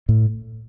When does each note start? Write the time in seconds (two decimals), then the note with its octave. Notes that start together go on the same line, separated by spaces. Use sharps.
0.09 A2